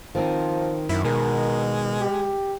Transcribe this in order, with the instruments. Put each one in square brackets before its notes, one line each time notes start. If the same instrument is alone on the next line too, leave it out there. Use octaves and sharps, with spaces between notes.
[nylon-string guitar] D#3 C4 D#4 [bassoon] F3
[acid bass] F#2 [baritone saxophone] E4
[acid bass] B2 [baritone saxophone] G#3 [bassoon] A#4
[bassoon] G4